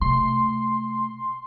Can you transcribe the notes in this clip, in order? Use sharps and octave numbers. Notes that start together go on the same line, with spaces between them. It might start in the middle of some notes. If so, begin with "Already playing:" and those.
C3 A3 C6